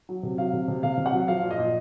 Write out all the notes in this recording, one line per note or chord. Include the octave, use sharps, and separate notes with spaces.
F#3
C3
F#3 F5
C3
C3
C3 F5
C3
F#5
F#3
F3 F5
A#2
D#5
A#2